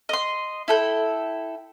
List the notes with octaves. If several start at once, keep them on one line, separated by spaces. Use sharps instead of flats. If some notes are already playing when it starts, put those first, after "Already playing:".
D#5 C6
E4 A4 G5